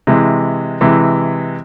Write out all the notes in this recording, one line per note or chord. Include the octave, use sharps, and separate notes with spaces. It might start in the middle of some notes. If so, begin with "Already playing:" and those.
C3 E3 G#3
C3 E3 G#3